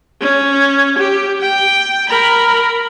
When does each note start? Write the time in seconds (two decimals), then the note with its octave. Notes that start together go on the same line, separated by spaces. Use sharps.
0.21 C#4
0.98 G4
1.41 G5
2.09 A#4 B5